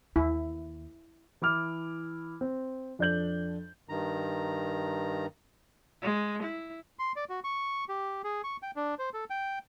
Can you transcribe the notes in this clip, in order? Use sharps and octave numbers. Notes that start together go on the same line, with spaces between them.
D#2 E4
E3 E4 D6 F6
C4
F2 D4 A4 G6 F#7
G2 D#3 A#5
G#3
E4
C6
D5
F#4
C#6
G4
G#4
C#6
G5
D4
C5
A4
G5